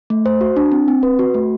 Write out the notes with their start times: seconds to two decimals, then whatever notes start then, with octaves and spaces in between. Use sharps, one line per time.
0.10 A3
0.26 C5
0.41 F#4
0.56 D4
0.72 C4
0.88 C4
1.03 B4
1.19 F#4
1.34 A3